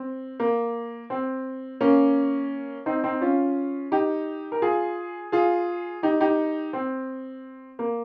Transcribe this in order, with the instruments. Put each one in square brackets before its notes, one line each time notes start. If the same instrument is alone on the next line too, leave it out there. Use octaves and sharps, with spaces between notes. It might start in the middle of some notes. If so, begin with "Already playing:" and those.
Already playing: [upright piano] C4
A#3
C4
A#3 C#4
C4 D#4
C4 D#4
C#4 F4
D#4 G4
A#4
F4 G#4
F4 G#4
D#4 G4
D#4 G4
C4
A#3